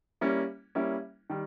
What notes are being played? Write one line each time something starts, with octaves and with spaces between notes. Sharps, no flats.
G3 A#3 C#4 E4
G3 A#3 C#4 E4
D#3 G3